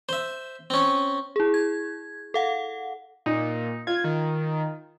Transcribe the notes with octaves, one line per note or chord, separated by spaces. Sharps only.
C5 E5
C4 C#4
E4 G#4
G#6
A4 F5 F#5
A#2 D#4
F4 G#6
D#3